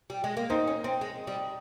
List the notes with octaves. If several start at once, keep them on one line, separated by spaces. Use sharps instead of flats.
G3
G#3
A#3
C4 D#4
C#4
C4
G#3
G3